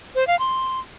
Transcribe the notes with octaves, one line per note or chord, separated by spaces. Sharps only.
C5
F5
C6